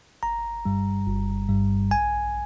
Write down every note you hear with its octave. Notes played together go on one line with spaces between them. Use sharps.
G1 A#5
G2 G3
G1
G2 G3
A#1 G#5